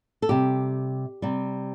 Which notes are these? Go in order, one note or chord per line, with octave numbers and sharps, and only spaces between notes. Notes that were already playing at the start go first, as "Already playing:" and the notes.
A4
C3 G3 G4
C3 G3